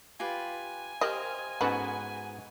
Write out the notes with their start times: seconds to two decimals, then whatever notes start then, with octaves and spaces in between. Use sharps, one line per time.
0.20 F4 G4 B4 G#5
1.01 G4 A#4 C5 D#5 F5 G5
1.61 G#2 B3 C#4 F#4 A4 B4